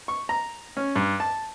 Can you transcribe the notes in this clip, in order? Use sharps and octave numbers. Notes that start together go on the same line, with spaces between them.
C#6
A#5
C#4
G2
A5